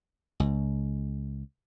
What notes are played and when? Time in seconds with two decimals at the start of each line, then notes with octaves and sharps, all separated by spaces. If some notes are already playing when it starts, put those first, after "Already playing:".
0.40 C#2